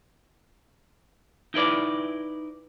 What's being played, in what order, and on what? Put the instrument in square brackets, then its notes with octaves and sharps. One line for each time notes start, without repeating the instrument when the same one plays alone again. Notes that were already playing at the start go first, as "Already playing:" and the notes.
[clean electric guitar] D#4 E4 B4 D5